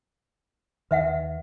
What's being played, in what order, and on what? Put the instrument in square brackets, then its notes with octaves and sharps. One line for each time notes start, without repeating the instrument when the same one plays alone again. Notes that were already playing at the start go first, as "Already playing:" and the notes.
[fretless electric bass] D#2 D#3 [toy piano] B4 E5 F#5